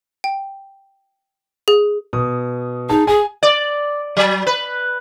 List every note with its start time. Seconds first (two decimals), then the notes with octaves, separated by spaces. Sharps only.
0.24 G5
1.68 G#4
2.13 B2 D#6
2.89 D#4 G#4 A5
3.07 G#4 G#5
3.43 D5
4.17 F#3
4.47 B4